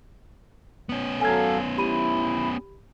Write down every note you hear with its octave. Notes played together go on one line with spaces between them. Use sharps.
B3 C#4
F#3 A4 F5 G#5 G#6
E4 G4 B5 D#7